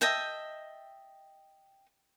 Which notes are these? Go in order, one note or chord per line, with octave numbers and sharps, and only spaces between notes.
D#5 E5 G5 A5